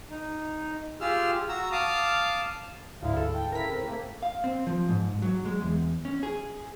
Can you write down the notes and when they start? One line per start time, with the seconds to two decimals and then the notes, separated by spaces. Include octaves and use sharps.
0.10 D#4
1.01 F4 G4 G#4 E6 F6
1.49 F#4 A#5 E6
1.72 F5 A5 D6 D#6 F6
3.03 D2 G#2 E4 F5
3.17 A4
3.35 G5
3.52 C#3 E4 A#4 A#5 B6
3.70 C#3 C4
3.83 G#2 A3 A#3
4.23 F5
4.44 C4
4.67 F3
4.88 G#2
5.22 F#3
5.46 G#3
5.61 E2
6.05 C#4
6.23 G#4